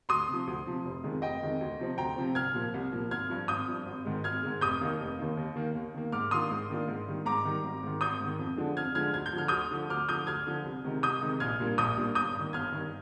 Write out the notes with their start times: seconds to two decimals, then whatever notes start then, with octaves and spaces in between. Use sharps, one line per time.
0.09 D2 C6 D#6
0.28 C3 F3
0.47 D2
0.65 C3 F3
0.85 F1
1.04 F2 D#3 G#3
1.22 F1 D#5 G5
1.42 F2 D#3 G#3
1.61 D2
1.79 C3 F3 C4
1.98 D2 G5 A#5
2.16 C3 F3 C4
2.35 C2 F6 G#6
2.54 A#2 F3 A#3
2.74 C2
2.92 A#2 F3 A#3
3.11 G#1 F6 G#6
3.30 G2 F3
3.48 G#1 D#6 G6
3.68 G2 F3
3.86 G#1
4.05 G#2 D#3 G#3
4.24 G#1 F6 G#6
4.42 G#2 D#3 G#3
4.61 F1 D#6 G6
4.81 D#2 D#3 A#3 D#4
5.00 F1
5.19 D#2 D#3 A#3 D#4
5.37 D#2
5.56 D#3 A#3
5.75 D#2
5.94 D#3 A#3
6.12 G#2 D6 F6
6.31 D#3 A#3 D4 F4 C6 D#6
6.51 G#2
6.70 D#3 A#3 D4 F4
6.88 G#2
7.06 D#3 G3
7.25 G#2 A#5 D6
7.45 D#3 G3
7.64 G#1
7.83 G#2 D#3
8.01 G#1 D#6 G6
8.21 G#2 D#3
8.39 F2
8.57 D3 F3 G#3 D4
8.77 F2 F6 G#6
8.95 D3 F3 G#3 D4 F6 G#6
9.14 D2 G#6
9.26 G6
9.33 D3 F3 F6
9.48 D2 D#6 G6
9.71 D3 F3
9.90 D2 D6 F6
10.09 D3 F3 D#6 G6
10.27 D2 F6 G#6
10.47 D3 F3
10.65 C2
10.84 C3 D#3 G#3 D#4
11.02 C2 D#6 G6
11.21 C3 D#3 G#3 D#4
11.40 A#1 F6 G#6
11.60 A#2 G3 A#3 D4
11.78 A#1 D#6 G6
11.97 A#2 G3 A#3 D4
12.15 G1 D#6 G6
12.35 G2 D#3
12.53 G1 F6 G#6
12.72 G2 D#3